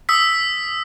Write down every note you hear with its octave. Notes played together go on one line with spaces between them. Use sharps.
D#6 E6 B6